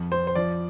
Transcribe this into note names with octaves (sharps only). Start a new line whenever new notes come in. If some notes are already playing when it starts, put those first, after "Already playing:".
Already playing: F2
F2 C5
C5
F3 D5